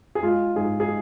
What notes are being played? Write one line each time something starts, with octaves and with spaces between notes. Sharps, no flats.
G#4
G#3 F4
G#2 G#4
G#4